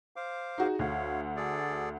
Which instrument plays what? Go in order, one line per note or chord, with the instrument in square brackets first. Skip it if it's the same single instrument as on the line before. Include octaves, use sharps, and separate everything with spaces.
[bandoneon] C5 F5 D6
[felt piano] D#4 F#4 G#4
[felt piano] D2 [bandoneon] C#5 F5
[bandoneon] G#4 A4 D5